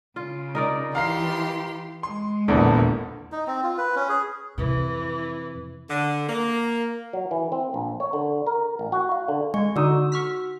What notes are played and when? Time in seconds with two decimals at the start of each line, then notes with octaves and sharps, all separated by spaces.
0.16 C#3 F4
0.55 D#4 A#4 D5
0.95 E3 G4 F5 A#5 C6 C7
2.03 G#3 C6
2.48 D#1 A#1 E2 D3 A#3
3.32 D#4
3.47 C4
3.63 F4
3.78 B4
3.96 C#4
4.09 G#4
4.58 F2 C3 E3
5.89 D3
6.29 A#3
7.13 F#3
7.31 E3
7.52 C4
7.74 A#1
8.00 C#5
8.13 D3
8.46 A#4
8.79 A1
8.92 F#4
9.12 F5
9.28 D3
9.54 G#3 C#6
9.76 D3 D#4 F#4 E6
10.12 C#6 F6 B6